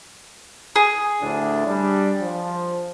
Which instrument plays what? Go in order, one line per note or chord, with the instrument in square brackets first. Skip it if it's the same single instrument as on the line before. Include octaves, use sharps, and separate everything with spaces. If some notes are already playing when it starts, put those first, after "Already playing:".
[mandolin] G#4
[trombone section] D2 A2 D4
G3 D4
F3